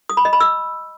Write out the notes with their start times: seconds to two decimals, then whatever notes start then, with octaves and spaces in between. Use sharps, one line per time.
0.09 D#6
0.17 B5
0.25 D#5
0.33 B5
0.40 E6